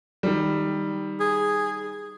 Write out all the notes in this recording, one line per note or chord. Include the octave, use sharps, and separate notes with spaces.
D#3 G3
G#4